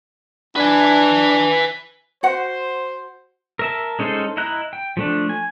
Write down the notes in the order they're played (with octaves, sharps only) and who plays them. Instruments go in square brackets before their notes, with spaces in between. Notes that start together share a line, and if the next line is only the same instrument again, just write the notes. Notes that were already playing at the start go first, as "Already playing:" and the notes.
[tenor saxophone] D4 [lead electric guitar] B4 G#5
[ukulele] F#4 F#5 [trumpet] C5
[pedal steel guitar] A#4 E5 A5
G#3 C#4 D#4 A4 C5
E4 D#5 A#5 F#6
G5
F3 A3 D4
G#5